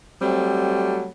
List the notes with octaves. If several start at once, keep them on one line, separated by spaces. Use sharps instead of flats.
F#3 G3 A3 C4